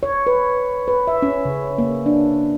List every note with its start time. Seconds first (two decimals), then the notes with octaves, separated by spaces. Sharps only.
0.03 C#5
0.27 B4
0.88 B4
1.08 E5
1.22 C#4
1.45 C#3
1.78 A#3
2.06 D4